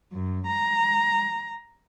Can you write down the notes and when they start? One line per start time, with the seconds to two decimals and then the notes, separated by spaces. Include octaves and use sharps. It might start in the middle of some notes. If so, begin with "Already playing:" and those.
0.11 F#2
0.46 A#5